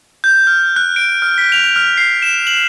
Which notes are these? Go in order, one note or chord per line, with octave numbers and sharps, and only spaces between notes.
G6
F6
F#6
D7
F6
B6
F7
F6
C7
E7
F#7